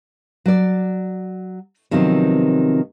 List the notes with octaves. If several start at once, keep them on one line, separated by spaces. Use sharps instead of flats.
F#3 D5
C3 D#3 F3 F#3 B3 C4